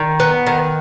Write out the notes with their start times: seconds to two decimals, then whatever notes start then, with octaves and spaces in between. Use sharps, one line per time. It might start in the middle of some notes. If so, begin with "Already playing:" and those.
Already playing: D#3
0.20 B3
0.47 D#3